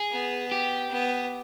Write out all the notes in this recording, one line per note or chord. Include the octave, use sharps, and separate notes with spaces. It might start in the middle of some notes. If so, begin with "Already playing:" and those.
Already playing: G#4
B3
G4
B3